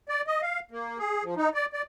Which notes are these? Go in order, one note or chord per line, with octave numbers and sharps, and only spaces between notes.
D5
D#5
F5
A#3
G#4
F3
D#4
D5
D5